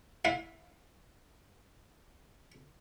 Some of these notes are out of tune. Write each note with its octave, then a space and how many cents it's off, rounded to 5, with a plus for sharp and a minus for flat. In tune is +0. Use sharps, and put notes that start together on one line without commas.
E4 +0 F5 +35